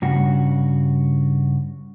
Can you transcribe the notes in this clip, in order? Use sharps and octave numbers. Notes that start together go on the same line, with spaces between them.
G2 C#3 F#4